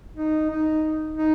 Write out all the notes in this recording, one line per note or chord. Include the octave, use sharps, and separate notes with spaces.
D#4
D#4
D#4